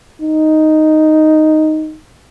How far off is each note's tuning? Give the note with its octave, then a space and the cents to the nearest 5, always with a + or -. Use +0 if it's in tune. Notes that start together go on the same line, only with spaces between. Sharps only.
D#4 +0